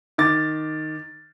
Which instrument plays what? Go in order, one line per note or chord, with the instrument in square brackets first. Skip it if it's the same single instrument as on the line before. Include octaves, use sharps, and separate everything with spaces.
[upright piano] D#3 D6 A6